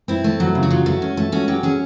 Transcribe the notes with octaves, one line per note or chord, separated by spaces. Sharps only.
C4 E4
A3
F#3
C#3
F#4
F#3 F4
A3 F#4
C#4
A3
C#4 F#4
F#3 G4
C#4 G#4